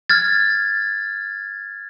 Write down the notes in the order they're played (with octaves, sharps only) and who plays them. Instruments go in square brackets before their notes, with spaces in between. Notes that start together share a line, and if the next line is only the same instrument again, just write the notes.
[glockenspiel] F6 G#6 A6